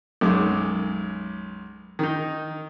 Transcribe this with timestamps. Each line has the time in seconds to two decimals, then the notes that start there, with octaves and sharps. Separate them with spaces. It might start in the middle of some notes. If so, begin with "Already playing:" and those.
0.21 B1 F#2 G#3 D6
1.99 D#3 D#4